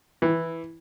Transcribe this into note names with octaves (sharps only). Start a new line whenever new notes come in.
E3